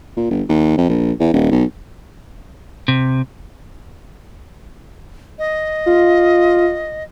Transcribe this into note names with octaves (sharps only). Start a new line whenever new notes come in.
A#2
G1
D#2
F2
A#1
E2
D#1
B1
C3
D#5
F4